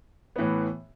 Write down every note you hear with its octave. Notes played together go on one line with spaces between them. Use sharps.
A2 E3 B3